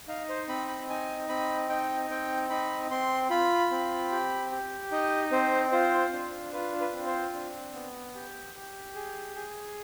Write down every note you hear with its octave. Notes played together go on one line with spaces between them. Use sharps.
D#4 F5
C5
C4 B5
B5
D#4 G#5
C4 B5
D#4 G5
C4 G5
D#4 B5
C4 C6
F4 B5
C4
G4
G4
D#4 D#5
C4 C5
F4 C5
D4
F4 B4
B4
C4
C5
D4
B3
G4
G4
G#4
G#4